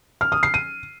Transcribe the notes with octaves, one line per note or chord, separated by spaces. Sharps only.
F6
D#6
C7
D#7